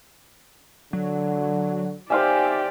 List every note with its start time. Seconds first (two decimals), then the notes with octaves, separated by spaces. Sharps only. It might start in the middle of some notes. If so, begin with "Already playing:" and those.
0.93 D3 F#3
2.10 D#4 G4 C5 D5 E5 F5 G#5